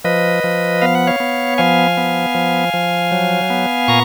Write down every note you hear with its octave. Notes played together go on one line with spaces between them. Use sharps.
F3 B4 D#5
F3
B3 F5
F#5
C#5 F5
B3
F3 F5 G#5
B3
F3
F3
F#3
B3
A#2 A#5 C#6